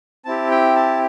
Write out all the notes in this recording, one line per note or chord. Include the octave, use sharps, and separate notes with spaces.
C4 E4 G4 A5
G5
A5